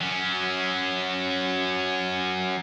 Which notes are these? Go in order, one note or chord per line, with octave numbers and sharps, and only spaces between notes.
F#3 C#4